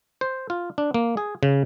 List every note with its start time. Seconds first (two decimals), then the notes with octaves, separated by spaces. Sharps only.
0.21 C5
0.50 F4
0.78 D4
0.94 A#3
1.17 G#4
1.43 C#3